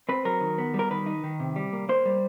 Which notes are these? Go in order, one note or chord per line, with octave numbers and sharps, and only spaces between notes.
C4 B4
F#3 A#4
D#3
B3
G3
A#4
D#3 B4
D#4
D#3
C3
G3
A#3
A#3 C5
G3